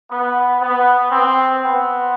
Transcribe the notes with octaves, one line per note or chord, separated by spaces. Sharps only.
B3
B3
C4
B3